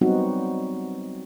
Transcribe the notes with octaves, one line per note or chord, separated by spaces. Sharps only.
F#3 G3 B3 C4 D#4 F#4